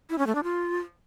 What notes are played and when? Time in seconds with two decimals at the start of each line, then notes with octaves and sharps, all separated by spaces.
0.10 E4
0.18 C#4
0.27 A3
0.35 D4
0.44 F4